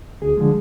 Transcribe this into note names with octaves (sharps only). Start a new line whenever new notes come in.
D2 G#4
D3 F3 G#3